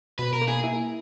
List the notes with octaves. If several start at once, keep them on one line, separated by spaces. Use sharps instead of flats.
B2 B4
A#4
A#3
G#4
E4